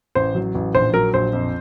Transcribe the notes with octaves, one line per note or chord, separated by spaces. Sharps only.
A1 C5
F#3
A1
A#1 C5
F#3 A#4
A#1 C5
F2